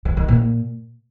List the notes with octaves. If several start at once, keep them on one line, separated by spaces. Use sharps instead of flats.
D#3
D#3
A#2